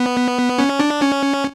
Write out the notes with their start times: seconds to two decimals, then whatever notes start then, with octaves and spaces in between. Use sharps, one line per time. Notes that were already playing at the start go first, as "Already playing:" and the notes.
Already playing: B3
0.58 C#4
0.79 D4
1.01 C#4